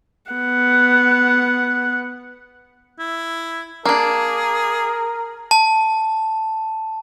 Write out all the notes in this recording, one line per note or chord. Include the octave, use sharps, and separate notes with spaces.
B3 F#5
E4
A#3 D4 G#4 A#4
A5